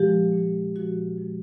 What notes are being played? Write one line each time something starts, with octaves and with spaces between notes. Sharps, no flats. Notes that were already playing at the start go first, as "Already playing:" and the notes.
Already playing: A#2 F3 G#3 G4
A#2 F3 G#3
A#2 F3 G#3 F#4
A#2 F3 G#3